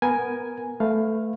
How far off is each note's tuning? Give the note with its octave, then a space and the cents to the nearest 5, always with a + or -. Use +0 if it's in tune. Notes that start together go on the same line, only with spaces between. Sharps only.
B3 +0 A#4 +0 G#5 +0
A3 +0 B4 +20 F5 +0